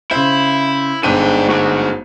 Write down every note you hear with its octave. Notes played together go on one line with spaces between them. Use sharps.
C#3 E4 C5 E5
G1 G#2 D4 A4 C5 G5 D#7
A3 D4 F#4